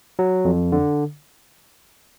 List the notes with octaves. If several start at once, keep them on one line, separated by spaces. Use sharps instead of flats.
F#3
F2
D3